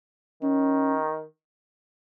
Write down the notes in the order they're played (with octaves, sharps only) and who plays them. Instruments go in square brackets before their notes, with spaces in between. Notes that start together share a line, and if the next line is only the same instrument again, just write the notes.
[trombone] D#3 [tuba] C#4